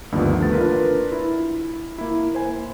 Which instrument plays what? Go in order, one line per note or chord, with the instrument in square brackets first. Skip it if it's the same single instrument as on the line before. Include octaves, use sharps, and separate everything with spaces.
[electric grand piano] D2 G2 D#3 F3 A#3 B3
A3 A6
D4 F4 A#4 B4
E4
A#3 E4
C5 G#5